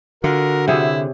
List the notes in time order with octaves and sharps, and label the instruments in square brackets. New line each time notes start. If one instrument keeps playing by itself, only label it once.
[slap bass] D3 [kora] F4 [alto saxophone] F#4 [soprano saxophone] A#4
[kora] C3 G#4 C#5 [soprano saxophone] E4